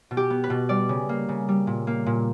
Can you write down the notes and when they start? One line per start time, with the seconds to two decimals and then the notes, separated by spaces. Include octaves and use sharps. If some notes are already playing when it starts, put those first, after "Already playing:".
0.11 B2
0.17 G4
0.30 B3
0.44 B4
0.50 B2
0.69 G3 D5
0.89 C#3
1.09 A#3
1.29 C#3
1.49 G3
1.67 A#2
1.87 A#3
2.06 A#2